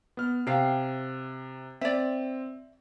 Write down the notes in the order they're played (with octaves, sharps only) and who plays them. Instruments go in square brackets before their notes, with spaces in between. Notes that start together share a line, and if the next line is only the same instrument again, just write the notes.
[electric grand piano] B3 F6
[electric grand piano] C3 [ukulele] F5 G5
[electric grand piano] C4 [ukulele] D5 E5